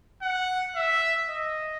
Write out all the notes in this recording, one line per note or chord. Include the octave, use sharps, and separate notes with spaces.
F#5
E5
D#5